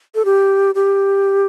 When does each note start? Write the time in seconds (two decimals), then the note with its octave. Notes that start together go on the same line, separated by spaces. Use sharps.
0.15 A4
0.25 G4
0.75 G4